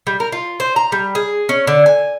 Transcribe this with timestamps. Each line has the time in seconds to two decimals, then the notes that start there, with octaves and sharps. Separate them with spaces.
0.07 G3
0.20 A#4
0.32 F4
0.60 C5
0.76 A#5
0.92 G3
1.15 G#4
1.49 C#4
1.67 D3
1.86 G#5